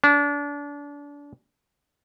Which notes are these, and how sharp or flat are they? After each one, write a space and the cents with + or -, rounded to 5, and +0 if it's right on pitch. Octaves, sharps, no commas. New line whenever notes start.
D4 -30